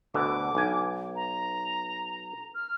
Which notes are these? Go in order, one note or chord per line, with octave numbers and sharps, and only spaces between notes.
D2 B2 D3 D6
B1 G#5
A#5
F6